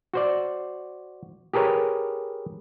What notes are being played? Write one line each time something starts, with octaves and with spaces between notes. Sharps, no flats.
F#4 C5 D5
G4 G#4 A#4 B4 C#5